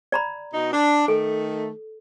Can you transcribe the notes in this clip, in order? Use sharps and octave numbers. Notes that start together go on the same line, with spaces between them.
D5 A#5 B5
B2 D#4
D4
D#3 A3 A4